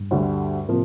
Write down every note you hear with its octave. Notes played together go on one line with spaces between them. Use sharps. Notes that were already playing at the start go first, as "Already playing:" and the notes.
Already playing: G2
D2 D3 G3
A2 C3 F3 A#3